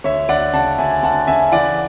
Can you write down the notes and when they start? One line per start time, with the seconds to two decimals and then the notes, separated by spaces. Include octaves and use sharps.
0.04 D2 C#5 E5
0.29 D2 D5 F#5
0.53 C#3 F#5 A5
0.78 D2 E5 G#5
1.03 D2 F#5 A5
1.27 C#3 E5 G#5
1.52 E3 D5 F#5